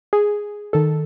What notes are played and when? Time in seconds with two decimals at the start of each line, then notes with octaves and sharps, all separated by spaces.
0.13 G#4
0.73 D#3 A4